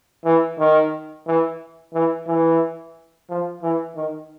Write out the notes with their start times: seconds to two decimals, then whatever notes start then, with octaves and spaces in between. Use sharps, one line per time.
0.25 E3
0.59 D#3
1.27 E3
1.94 E3
2.27 E3
3.29 F3
3.63 E3
3.96 D#3